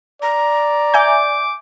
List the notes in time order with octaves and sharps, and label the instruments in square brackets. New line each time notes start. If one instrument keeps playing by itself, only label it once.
[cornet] D5 [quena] A#5
[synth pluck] E5 G#5 G6 [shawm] D6